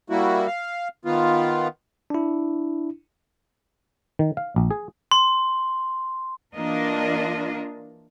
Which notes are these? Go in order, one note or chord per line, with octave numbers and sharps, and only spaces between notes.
G3 A#3 E4 F#4
F5
D#3 B3 F4
D4 E4
D#3
F5
A#1
G#4
C6
E3 A#3 D4 F4 A#4 D#5